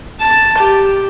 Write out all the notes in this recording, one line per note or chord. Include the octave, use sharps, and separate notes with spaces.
A5
G4